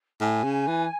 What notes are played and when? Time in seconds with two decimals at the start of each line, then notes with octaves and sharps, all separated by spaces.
0.20 A2 G#5
0.44 C#3
0.67 E3